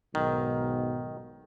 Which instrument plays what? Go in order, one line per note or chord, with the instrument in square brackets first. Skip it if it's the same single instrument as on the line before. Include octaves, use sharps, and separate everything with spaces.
[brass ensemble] B1 G#2 [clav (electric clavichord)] D#3